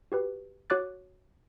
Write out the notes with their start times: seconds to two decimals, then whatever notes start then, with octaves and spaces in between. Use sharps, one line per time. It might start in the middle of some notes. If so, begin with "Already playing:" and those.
0.12 F#4 G4 B4
0.70 F#4 C#5 D6 F#6 A6